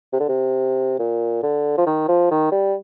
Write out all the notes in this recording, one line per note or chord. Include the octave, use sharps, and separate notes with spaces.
C3
D3
C3
A#2
D3
F3
D#3
F3
D#3
G3